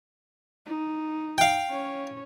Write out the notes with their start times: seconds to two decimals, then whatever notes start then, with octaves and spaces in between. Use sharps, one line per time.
0.66 D#4
1.38 F5 G5
1.70 C#4 C#5